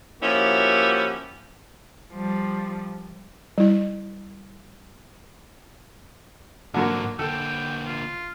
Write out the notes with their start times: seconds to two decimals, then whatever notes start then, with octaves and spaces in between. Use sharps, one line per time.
0.22 F3 A#3 C#4 E4 F#4 G4
2.14 F3 G3
3.58 G3 E4
6.74 G#2 D3 F#3 A#3 F#4
7.19 D3 A#3 A4 G5
7.87 F4